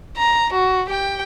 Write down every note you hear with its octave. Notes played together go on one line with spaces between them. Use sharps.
A#5
F#4
G4 G5